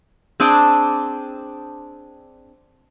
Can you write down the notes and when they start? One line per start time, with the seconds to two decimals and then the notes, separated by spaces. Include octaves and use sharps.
0.40 C4 D4 G#4 G5